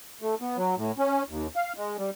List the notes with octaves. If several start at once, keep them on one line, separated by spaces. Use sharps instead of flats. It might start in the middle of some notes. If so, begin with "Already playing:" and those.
A3
B3
F#3
A2
C#4
D#2
F5
G#3
G3